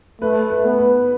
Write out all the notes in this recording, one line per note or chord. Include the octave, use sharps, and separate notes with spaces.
A3 B4
B4
B3
B4